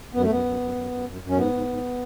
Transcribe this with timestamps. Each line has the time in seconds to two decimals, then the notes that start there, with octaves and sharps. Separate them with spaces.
0.13 F#2 B3
0.23 A3
0.30 F#2 B3
0.45 F#2
0.60 F#2
0.75 F#2
0.91 F#2
1.06 F#2
1.21 F#2
1.29 C#4
1.37 G#2 B3
1.53 G#2
1.67 G#2